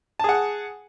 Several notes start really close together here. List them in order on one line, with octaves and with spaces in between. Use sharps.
A5 G#4 F#5